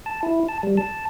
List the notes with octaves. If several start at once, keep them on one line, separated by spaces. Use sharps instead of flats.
A5
E4
A5
G3
A5